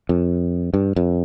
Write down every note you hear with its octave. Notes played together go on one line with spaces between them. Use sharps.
F2
G2
F2